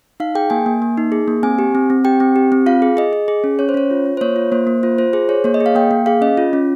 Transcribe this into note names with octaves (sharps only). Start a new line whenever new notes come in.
D#4 F5
G#4 G5
A#3 G#5
A#3
A#3
D#4
G#4
A#3
C4 G#5
G4
C4
C4
G4 G5
C4
G4
C4
F4 F5
G#4
G#4 D#5
G#4
G#4
C#4
C#4 C#5
C5
C#4 C#5
F4
F4
C5
A#3 C#5
F4
A#3 C5
A#3
F4 C5
F4 C5
G#4 C5
G#4 C#5
A#3 C#5
D#5
G#4
F5
A#3 G5
A#3
G#4 F5
C#4 D#5
F4
C#4